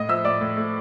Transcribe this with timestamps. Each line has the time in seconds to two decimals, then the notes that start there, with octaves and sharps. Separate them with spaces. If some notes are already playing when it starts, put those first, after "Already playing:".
Already playing: A2 D#5 D#6
0.09 F3 E5 E6
0.25 A2 D5 D6
0.41 A2
0.57 A3